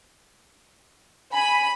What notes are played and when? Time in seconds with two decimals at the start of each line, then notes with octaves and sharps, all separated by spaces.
1.33 G#5 B5